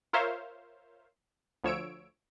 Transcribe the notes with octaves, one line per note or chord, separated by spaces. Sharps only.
F4 A#4 C5 C#5 E5 F5
D2 F3 C#5 E6 D7